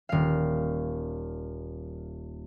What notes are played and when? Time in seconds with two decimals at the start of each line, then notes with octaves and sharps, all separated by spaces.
0.09 D#1 F5